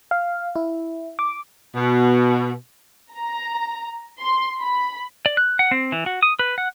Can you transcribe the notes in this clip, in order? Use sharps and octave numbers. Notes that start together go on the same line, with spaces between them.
F5
E4
D6
B2
A#5
C6
B5
D5
F#6
F#5
C4
E3
F#4
D#6
B4
F#5